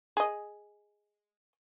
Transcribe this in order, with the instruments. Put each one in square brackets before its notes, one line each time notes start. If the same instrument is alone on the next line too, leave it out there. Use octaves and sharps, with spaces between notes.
[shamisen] G#4 D#5